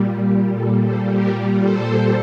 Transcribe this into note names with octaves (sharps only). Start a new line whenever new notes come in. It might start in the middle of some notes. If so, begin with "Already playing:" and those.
Already playing: A#2 G3
G4
A4
A4 C5
G4 A#4
A4 C5